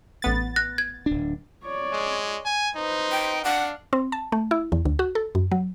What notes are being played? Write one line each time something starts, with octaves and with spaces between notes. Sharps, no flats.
A1 B3 A6
F#6 A#6
G#6
D1 D4
C#5 D5
G#3
G#5
D#4 B4 C5
G5
D4 F5 F#5
C4
A5
A3
E4
E2
D2
F#4
A4
F#2
F#3